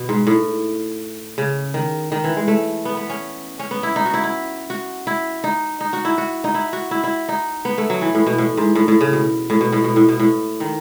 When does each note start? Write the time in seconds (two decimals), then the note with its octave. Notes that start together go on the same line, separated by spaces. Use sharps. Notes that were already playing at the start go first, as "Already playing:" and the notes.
Already playing: B2
0.09 G#2
0.27 A2
1.38 C#3
1.74 D#3
2.12 D#3
2.24 E3
2.36 G#3
2.48 A3
2.85 B3
2.97 B3
3.10 C#4
3.59 C#4
3.71 B3
3.83 E4
3.96 D#4
4.06 F#4
4.14 E4
4.24 E4
4.70 F#4
5.07 E4
5.44 D#4
5.81 D#4
5.93 F#4
6.05 E4
6.18 F#4
6.44 D#4
6.54 E4
6.73 F#4
6.91 E4
7.04 E4
7.29 D#4
7.65 B3
7.78 A3
7.90 F#3
8.01 E3
8.15 A2
8.27 B2
8.38 A2
8.57 G#2
8.75 A2
8.88 A2
9.01 C#3
9.13 B2
9.50 A2
9.61 B2
9.72 A2
9.84 B2
9.96 A2
10.09 B2
10.20 A2
10.60 D#3